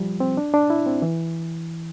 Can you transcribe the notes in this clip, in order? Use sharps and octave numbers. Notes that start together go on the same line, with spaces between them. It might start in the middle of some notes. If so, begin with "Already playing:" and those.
Already playing: F3 G3
C4
D4
D4
E4
C4
E3